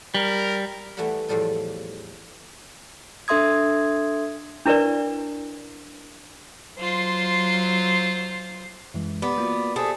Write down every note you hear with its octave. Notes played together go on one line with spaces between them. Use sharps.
G3 A#4
E3 G3 A3 E5 F#5 B5
E2 A2 F3 G3 A4 G5
D4 A4 E5 C6 D#6 G#6
D4 E4 A#4 B4 D5
F#3 F4 C5
F#2 E3 G#3
B3 G4 D5
A#3 F4 F#4
A3 G4 G#4 C5 D5